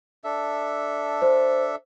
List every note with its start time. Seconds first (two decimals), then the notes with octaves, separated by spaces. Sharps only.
0.24 D4 A4 E5
1.22 C5